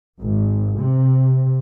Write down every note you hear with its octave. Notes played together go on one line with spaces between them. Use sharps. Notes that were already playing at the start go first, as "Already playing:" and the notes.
G#1
C3